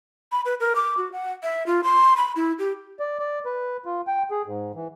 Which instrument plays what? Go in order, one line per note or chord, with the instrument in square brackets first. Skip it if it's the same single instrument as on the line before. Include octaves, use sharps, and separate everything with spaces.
[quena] B5
B4
A#4
D6
F#4
F#5
E5
F4
C6
B5
E4
G4
[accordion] D5
D5
B4
F4
G5
G#4
G#2
E3